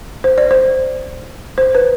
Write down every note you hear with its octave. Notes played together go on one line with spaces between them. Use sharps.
C5
D5
C5
C5
B4